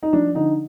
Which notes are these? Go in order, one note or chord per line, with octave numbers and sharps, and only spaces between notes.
D#4
F3 D4
D3 D#4